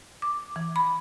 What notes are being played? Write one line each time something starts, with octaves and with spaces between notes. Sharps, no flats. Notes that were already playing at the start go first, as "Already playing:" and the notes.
D6
E3
B5